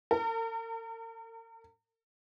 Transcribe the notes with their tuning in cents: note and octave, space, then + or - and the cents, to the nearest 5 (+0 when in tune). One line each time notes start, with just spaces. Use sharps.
A#4 -45